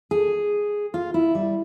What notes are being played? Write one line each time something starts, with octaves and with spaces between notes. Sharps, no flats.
G#4
F4
E4
G3